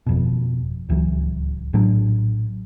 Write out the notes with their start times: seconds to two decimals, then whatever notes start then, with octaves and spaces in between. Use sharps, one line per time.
0.07 G1 F2 B2
0.89 D1 C#2 E3 F#3
1.73 A#1 A2 F#3 D4